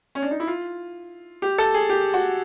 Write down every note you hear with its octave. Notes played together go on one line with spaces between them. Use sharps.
C#4
D4
D#4
E4
F4
G4
A4
G#4
G4
F#4